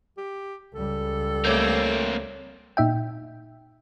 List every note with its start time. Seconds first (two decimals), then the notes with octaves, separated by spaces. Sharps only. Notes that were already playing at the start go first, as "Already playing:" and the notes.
0.17 G4
0.74 C#2 G3 A4
1.45 A3 A#3 C4 C#5 G6
2.77 A#2 D#4 E5 G5